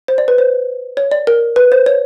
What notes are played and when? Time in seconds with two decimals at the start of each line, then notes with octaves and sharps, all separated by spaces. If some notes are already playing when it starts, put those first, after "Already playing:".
0.08 C5
0.18 D5
0.28 B4
0.38 C5
0.97 C#5
1.11 D5
1.27 A#4
1.56 B4
1.72 C5
1.86 C#5